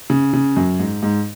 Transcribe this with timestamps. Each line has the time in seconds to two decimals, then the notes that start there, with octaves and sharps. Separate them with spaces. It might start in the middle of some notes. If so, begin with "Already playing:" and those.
0.10 C#3
0.33 C#3
0.56 F#2
0.79 G#2
1.03 G#2